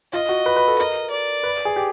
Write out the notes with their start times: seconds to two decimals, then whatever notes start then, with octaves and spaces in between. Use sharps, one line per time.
0.13 F4 D#5
0.29 F#4
0.46 B4
0.56 B4
0.68 A4
0.78 A#4 D#5
1.10 D5
1.43 B4
1.65 G#4
1.76 G4